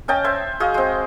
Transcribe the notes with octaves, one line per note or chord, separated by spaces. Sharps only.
C#4 D#5 G5 A5
C5 E5 G#5
F#4 G#4 D#5 F5
G#3 C4